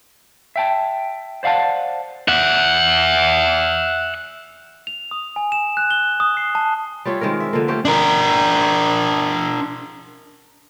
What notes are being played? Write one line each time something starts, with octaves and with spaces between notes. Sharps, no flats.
E5 G5 A5
C5 D5 F5 F#5 A5
E5 F#5
F7
D#6
G#5
E7
F#6
G7
D#6
C7
A5
G3 F4 C#5 E5
D#3 G#3 C4 A#4
E5
D3 F3 A#3
A3 C4 C#4 G4
D4 A#4